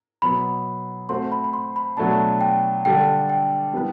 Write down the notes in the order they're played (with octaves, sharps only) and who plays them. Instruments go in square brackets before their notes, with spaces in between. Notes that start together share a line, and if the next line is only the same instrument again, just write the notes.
[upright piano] B2 F#3 B3 [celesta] B5
[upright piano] A3 C4 F#4 C5 [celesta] C6
[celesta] B5
B5
C6
B5
[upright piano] B2 F#3 A3 D4 [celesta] A5
[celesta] G5
[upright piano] D3 G3 D4 A4 [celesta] G5
[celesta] G5
[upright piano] G3 B3 E4 B4